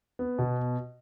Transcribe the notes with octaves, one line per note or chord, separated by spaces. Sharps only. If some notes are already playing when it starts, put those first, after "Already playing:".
B3
B2